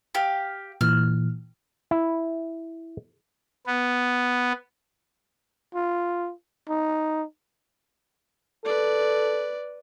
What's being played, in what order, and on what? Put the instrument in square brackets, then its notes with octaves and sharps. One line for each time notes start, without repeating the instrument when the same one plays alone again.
[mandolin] G4 F5
[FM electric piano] A#2 E3 [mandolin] F6
[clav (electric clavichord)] E4
[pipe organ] B3
[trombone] F4
D#4
[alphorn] A4 [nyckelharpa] B4 D5